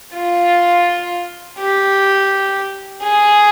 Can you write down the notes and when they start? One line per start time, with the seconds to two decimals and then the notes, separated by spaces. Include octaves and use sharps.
0.15 F4
1.59 G4
3.04 G#4